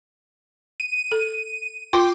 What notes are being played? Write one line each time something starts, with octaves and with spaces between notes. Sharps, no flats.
D#7
A4
F4 G5 C6 D6